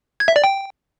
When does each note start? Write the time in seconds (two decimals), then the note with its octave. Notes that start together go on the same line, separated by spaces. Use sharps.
0.20 G#6
0.28 E5
0.36 D5
0.44 G5